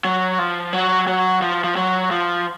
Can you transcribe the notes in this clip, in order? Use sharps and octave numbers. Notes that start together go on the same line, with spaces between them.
F#3
F3
F#3
F#3
F3
F3
F#3
F3